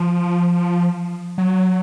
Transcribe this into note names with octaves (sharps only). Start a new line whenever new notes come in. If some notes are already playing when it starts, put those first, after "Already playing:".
Already playing: F3
F#3